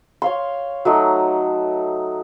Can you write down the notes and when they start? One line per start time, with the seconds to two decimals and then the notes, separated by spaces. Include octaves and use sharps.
0.22 C#5 F5 C6
0.85 F#3 A3 D#4